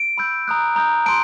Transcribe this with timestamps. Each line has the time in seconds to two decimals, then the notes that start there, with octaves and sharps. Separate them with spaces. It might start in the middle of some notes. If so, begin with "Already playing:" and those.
Already playing: D7
0.18 B5 E6 G6
0.48 A#5 D#6 F#6
0.76 A#5 D#6 G6
1.06 A5 C6 D7